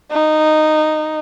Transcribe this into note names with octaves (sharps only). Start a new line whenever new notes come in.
D#4